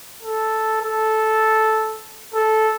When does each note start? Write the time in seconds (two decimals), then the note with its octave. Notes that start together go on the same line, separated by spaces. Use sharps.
0.23 A4
0.82 A4
2.34 A4